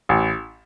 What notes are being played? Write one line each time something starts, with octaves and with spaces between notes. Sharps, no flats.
A1